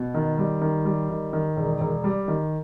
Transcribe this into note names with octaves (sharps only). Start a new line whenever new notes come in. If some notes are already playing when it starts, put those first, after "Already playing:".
Already playing: B2
D#3
G3
D#3
G3
D#3
D#3
E1
E1
G3
D#3